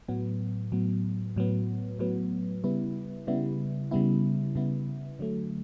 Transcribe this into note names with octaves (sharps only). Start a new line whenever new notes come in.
A2 F#3 B3
A2 F#3 B3
A2 F#3 B3
A2 F#3 B3
C#3 G3 B3 E4
C#3 G3 B3 E4
C#3 G3 B3 E4
C#3 G3 B3 E4
D3 F#3 A3